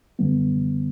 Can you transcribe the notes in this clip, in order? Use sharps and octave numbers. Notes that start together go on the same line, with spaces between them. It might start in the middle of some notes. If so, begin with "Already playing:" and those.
F#2 D3 G3 B3